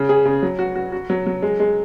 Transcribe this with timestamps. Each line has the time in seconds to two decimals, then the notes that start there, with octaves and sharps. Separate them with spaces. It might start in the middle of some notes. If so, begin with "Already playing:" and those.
Already playing: C#3
0.09 G#4
0.25 C#3
0.43 F#3
0.59 F#4
0.75 F#4
0.92 F#4
1.10 F#3
1.27 F#3
1.42 G#3
1.60 G#3